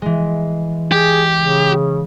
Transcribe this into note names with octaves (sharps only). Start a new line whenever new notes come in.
E3 G#3
G4 G#4
C#3